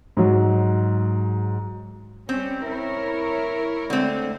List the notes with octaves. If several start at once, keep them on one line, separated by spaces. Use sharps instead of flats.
G#2 F#3
G3 C4 C#4
E4 A#4 C#5
D3 G#3 A3 C4